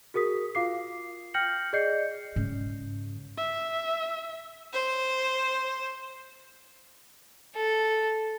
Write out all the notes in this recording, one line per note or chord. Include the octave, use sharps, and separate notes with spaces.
F#4 G#4 A#4 D#6 B6
F4 F5 D6 C7
G5 F6 G6 A#6 C#7 F#7
G#4 D5 D#5 G6 C7 C#7
G#2 C#3
E5
C5
A4